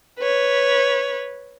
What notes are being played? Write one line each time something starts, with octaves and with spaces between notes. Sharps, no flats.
B4 C#5